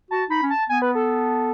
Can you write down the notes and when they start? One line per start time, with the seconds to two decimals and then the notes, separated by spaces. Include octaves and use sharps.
0.11 F#4 A5
0.30 D#4 B5
0.43 C#4
0.50 A5
0.69 B3 G#5
0.82 B4
0.95 A4